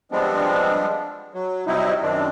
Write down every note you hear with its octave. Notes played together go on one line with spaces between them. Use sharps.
F3 G3 G#3 B3 C4 D4
F#3
C3 F#3 G3 D#4 E4
F#2 D#3 C4 D4